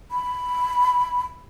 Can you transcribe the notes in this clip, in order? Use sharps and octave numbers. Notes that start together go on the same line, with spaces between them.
B5